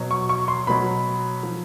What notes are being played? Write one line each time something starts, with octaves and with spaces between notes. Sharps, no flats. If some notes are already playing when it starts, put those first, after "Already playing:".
Already playing: B2 F#3
C#6
C#6
C6
B2 F#3 B5
F3